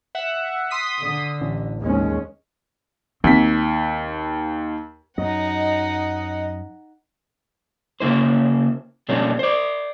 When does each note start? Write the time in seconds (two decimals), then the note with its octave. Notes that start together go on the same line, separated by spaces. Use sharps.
0.15 E5 F#5
0.71 C6 D#6 B6
1.00 D3
1.41 A1
1.78 D#2 G#3 C#4
3.24 D#2 C4 B6
5.18 F#2 F#3 D#4 D#5 F#5
8.00 C#3 A#3 E4 C5
9.09 B2 F3 G3 A#3 C#4 D4
9.39 C5 D5